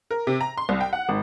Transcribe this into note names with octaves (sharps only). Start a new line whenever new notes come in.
A#4
C3
A#5
C6
C2
G5
F#5
G#1